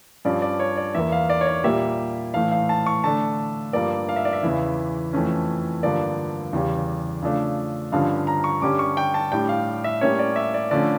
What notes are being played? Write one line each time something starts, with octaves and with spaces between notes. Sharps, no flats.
G2 F3 C#4 D5
D5
C#5
D5
E2 E3 A#3 E5
F5
D5
C#5
D5
A#2 G3 A#3 E5
A2 E3 A3 F5
F5
A5
C#6
D3 A3 D4 A5
G2 F3 A#3 D5
F5
E5
D5
E5
E2 C#3 E3
F2 E3 A3 C#4
G2 D3 F3 A#3 D4 D5
E2 C#3 G3
C#3 F3 A3 D4
G2 D3 F3 C#4 F5
A#5
C#6
G2 D3 G3 C#4 D6
C#6
G5
A5
A2 G3 D4 G5
F5
E5
A2 G3 A#3 C#4 C#5
D5
E5
D5
D3 F3 A3 C#4 D5